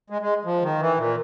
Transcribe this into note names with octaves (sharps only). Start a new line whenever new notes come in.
G#3
G#3
F3
D#3
E3
A#2